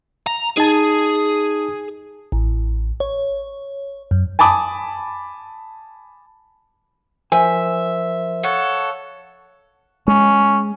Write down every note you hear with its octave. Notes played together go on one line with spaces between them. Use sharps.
A#5
D#4 G#4 A5
A1
C#5
F#2
G#5 A5 B5 D6 D#6
F3 A#4 C5 E5 G#5
A4 C#5 F5 F#5
G#3 C#4